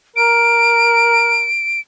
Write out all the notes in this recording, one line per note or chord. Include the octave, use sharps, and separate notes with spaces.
A#4 D7